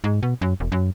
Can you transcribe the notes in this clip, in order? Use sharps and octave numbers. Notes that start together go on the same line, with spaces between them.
G#2
B2
F#2
E1
F#2